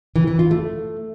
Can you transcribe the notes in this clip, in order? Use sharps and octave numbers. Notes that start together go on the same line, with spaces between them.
E3
E3
F4
A3